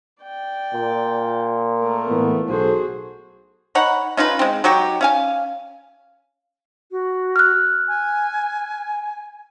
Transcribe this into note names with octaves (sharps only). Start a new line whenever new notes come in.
D5 G5
A#2
A3 A#4
A2 E3 B3
B1 F#4 G#4 A4 C5
D#4 C#5 F#5 B5
C#4 D#4 F4 B4
G#3 C4
F#3 D#4 F#4 G4
C#4 F5 G#5
F#4
F6 F#6
G#5